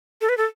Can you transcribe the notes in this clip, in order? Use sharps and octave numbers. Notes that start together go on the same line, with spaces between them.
A4
B4
A4